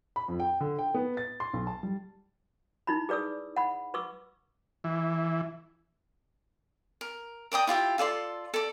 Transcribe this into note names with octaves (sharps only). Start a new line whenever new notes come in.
B5
F2
G5
D3
G5
B3
A6
C6
B1
A5
G3
D#4 E4 B5
G#4 B4 D5 D#6 E6
F#5 B5
B4 C#6 D6 E6
E3
A#4
A#4 D5 G5 D#6
E4 F4 G4 E5
F4 A4 D5 C6
A4 D5